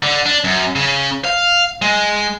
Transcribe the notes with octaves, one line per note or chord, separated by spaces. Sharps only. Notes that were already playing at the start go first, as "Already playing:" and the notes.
D3
D4
F#2
C#3
F5
G#3